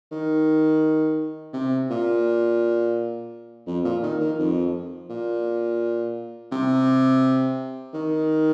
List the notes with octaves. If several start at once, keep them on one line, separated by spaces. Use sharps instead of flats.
D#3
C3
A#2
F2
A#2
D#3
D#3
F2
A#2
C3
D#3